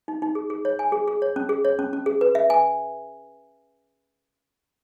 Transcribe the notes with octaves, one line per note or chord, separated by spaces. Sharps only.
D#4
D#4
G#4
G#4
C#5
G#5
G#4
G#4
C#5
C#4
G#4
C#5
C#4
C#4
G#4
B4
E5
G#5